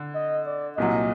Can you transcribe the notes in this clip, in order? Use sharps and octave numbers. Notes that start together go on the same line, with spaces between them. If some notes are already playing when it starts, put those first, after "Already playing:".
Already playing: D3
D#5
D5
C2 A#2 F#3 D#5